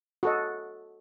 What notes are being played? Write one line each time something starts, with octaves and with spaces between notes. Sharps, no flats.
F#4 A4 D#5